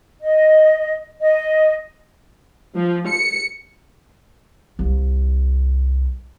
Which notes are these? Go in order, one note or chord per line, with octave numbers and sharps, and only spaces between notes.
D#5
D#5
F3
C#7
C2 E4